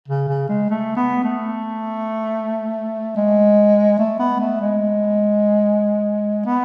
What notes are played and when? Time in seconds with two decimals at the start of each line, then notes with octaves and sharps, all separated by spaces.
0.08 C#3
0.28 C#3
0.49 G#3
0.70 A3
0.97 B3
1.24 A3
3.16 G#3
3.99 A3
4.19 B3
4.40 A3
4.61 G#3
6.46 B3